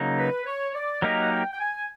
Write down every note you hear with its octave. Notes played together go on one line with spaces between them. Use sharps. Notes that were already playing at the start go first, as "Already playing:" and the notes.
Already playing: C#3 F#3 A#3 D#4
B4
C#5
D5
F#3 A#3 D#4 G4 A#4 D#5
F#5
G5
G5
G#5